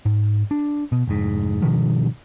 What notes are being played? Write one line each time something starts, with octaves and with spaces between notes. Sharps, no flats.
G#2
D4
B2
F1 G#2
G2 B2 D#3 F3